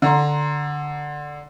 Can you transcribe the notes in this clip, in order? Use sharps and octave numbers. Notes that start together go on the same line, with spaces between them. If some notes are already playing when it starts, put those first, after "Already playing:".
D3 A#5 C6